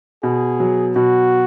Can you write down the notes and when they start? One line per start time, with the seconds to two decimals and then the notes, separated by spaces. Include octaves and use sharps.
0.23 B2 G#4
0.60 F#3
0.95 B2 F#4